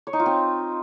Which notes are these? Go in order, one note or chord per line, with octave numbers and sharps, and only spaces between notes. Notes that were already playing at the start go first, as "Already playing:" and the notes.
C#5
D#4
F4
C4